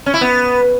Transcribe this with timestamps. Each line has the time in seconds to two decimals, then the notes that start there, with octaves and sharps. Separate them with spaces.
0.06 C#4
0.14 E4
0.21 B3